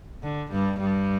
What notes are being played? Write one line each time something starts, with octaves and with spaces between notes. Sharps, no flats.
D3
G2 G3
G2 G3